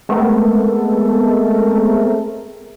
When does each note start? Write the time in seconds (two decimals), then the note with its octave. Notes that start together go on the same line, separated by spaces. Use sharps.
0.09 G#3 A3 B3 C4 A4 A#4